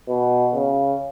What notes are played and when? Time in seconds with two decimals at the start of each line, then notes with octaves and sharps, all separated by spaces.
0.09 B2
0.54 C#3